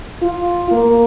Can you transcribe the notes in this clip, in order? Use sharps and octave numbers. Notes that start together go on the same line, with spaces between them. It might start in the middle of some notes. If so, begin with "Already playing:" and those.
F4
A#3